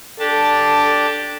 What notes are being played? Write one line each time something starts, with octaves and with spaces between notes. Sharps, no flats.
D4 G4 A4 A5